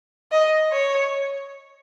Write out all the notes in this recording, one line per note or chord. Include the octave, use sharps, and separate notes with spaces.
D#5
C#5